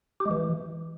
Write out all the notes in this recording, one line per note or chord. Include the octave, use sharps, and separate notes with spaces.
G4
G#3
E3